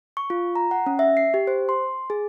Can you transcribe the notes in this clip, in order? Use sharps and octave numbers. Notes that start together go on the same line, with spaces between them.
C#6
F4
A#5
F#5
C#4
E5
C7
G4
C5
C6
G#4